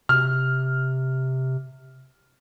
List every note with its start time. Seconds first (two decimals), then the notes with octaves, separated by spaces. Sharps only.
0.09 C3 F6